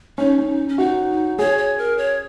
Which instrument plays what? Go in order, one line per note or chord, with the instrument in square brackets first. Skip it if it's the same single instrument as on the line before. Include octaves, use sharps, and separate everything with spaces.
[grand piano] C#4 [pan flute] D#4
[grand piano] C#4
[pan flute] C#4
[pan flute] D#4 [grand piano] F#4
[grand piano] G#4 [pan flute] C#5
[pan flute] C#5
A#4
C#5